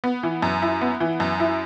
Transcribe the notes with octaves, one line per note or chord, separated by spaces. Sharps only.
B3
E3
F#2
E4
B3
E3
F#2
E4